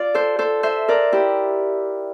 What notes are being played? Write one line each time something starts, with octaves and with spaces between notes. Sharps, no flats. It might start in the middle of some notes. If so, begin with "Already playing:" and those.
Already playing: F4 D5
A4 C5
A4 C5
C5 E5
A#4 D5
E4 G4